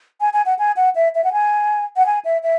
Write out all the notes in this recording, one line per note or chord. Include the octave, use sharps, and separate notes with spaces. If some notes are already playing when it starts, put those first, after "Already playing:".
G#5
G#5
F#5
G#5
F#5
E5
E5
F#5
G#5
F#5
G#5
E5
E5